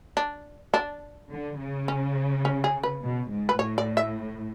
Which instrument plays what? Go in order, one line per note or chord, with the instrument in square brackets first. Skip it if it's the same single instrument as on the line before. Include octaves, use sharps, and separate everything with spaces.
[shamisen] D4
D4
[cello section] D3
C#3
[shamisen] C#4
C#4
G#4
B4
[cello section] B2
G#2
[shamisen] B4
[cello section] A2 [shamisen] C#5
[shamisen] D5
E5